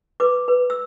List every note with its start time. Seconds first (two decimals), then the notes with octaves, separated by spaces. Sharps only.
0.20 B4 D6
0.48 B4
0.70 E6